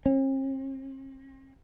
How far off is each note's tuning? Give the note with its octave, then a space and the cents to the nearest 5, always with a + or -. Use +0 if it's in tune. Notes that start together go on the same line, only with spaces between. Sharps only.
C4 +45